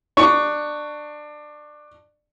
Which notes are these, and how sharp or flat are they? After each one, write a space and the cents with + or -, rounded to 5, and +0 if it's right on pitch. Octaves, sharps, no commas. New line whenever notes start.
D4 +20 C#6 +10